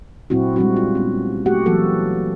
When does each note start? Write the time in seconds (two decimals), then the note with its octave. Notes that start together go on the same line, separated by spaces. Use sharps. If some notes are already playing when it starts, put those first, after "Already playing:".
0.30 A#2 F#3 C4 E4 F#4
0.56 G3 G#3 C4 D4 F#4
0.77 F4
0.95 B3 C#4
1.46 A3 F#4 G4 F#5
1.66 E3 F#3 A#3 F#4 A4